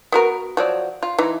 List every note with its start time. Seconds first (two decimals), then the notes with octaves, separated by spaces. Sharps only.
0.12 B3 F#4 A#4
0.57 F3 F#3 D5
1.03 F4
1.18 E3 D#4